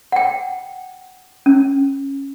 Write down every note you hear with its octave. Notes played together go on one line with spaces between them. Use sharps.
F#5 G5
C#4